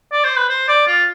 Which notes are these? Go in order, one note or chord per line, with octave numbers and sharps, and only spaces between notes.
D5
C5
B4
C5
D5
F4